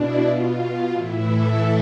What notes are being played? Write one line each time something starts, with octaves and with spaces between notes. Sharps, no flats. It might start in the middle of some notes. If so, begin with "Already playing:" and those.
Already playing: B2 D4 E4
B2 F4
F4
A2 E3 E4
A4